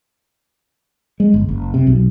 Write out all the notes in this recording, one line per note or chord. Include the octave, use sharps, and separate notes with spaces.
G#3
G1
F#1
C3
B1